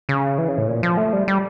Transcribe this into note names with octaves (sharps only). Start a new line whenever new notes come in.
C#3
E3
C#3
A2
A#2
F3
A3
G3
G3